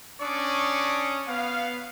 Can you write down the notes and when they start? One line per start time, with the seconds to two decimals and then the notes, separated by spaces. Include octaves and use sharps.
0.21 C#4 D4 D5 C#6 D#6
1.27 B3 F5